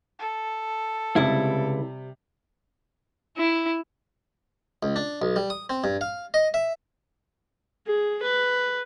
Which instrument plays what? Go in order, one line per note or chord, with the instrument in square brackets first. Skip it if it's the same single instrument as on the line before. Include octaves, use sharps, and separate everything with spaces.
[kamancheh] A4
[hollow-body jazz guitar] C#2 E4 [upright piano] C3 G3
[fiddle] E4
[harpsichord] C#2
D4
B1
G3
D#6
C4
G2
F5
D#5
E5
[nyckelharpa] G#4
B4